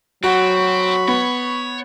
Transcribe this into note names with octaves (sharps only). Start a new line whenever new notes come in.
F#3 C4 F#4 B5 C#6
B3 C#5